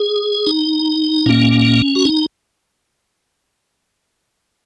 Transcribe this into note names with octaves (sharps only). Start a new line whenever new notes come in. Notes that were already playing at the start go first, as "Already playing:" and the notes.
Already playing: G#4
D#4
A#2 A#3 C#4
F#4
D#4